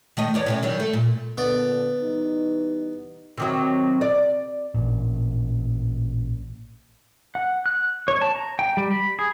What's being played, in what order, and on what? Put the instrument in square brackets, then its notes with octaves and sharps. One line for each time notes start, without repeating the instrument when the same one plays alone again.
[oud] D#3 A3 D#5
E2 C#5 D5
A2 C3 C#4
D#3 F#3 G3
A3
A#2
[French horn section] A#2 D3 [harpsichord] B3 D5
[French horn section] E3 G3 D#4
[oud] C3 D#3 F#3
D5
[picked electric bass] A1 A#2
[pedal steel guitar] F#5
F#6
C#5
A5
A#5
G5
G3
B5
G#4